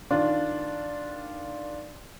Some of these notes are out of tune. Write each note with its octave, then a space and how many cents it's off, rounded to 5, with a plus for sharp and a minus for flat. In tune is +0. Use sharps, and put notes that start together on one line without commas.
D#3 +0 D4 +0 F4 +0